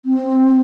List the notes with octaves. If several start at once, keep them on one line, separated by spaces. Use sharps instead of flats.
C4